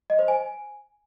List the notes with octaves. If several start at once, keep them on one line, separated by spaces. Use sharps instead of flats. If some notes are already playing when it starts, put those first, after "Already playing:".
D#5
C5
G#5